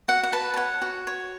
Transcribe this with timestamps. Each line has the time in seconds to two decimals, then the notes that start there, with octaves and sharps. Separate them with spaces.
0.08 F#4 F#5
0.23 F#5
0.32 B4 A5
0.54 A5
0.56 C#5 F#5
0.82 F#4
1.07 C#5